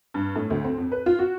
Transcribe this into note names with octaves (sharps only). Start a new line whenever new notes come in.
G2
A2
D2
C4
F2
B4
F4
F#4